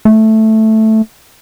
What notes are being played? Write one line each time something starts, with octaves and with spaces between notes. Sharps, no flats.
A3